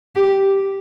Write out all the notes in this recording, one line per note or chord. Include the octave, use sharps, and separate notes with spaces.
G4